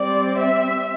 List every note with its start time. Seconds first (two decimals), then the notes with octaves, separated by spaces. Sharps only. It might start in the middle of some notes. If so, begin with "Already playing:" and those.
Already playing: G3 C4 D5
0.41 E5